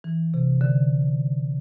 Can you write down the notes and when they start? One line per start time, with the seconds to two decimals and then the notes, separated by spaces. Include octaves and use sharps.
0.04 E3
0.34 C3
0.61 D3